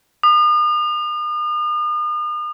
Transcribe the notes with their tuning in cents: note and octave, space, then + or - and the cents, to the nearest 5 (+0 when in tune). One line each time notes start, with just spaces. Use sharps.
D#6 -40